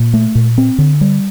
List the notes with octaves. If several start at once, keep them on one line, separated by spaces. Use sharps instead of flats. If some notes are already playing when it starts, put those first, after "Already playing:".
Already playing: A#2
A3
A#2
C4
D3
G3